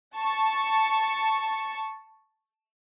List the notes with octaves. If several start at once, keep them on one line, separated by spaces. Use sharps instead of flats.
A5 C#6